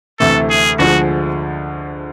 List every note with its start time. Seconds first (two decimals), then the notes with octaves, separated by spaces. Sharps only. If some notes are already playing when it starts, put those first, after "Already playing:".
0.20 D2 C3 E3 A3 A4
0.50 G#4
0.79 D2 D3 F3 G#3 F#4